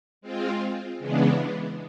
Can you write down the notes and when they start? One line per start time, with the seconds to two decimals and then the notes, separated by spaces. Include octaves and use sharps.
0.21 G#3 C4 F4
0.99 C#3 E3 G#3 B3 D4